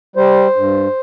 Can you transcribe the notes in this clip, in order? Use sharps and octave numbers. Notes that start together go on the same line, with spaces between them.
G3 C5
G2